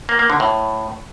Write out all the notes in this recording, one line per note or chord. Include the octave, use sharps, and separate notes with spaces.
A#3
A#3
D3
A2